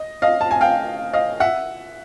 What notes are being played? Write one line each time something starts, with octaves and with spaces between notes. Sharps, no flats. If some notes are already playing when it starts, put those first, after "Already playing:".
Already playing: D#5
D#5 F5
A5
G#5
F5 G5
D#5 F5
E5 F#5